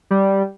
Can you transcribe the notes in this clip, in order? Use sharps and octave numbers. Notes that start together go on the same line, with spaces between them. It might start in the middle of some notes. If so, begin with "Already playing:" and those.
G3